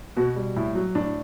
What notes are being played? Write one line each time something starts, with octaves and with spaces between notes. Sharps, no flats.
B2 F#4
G3
A2 E4
F#3
A2 D4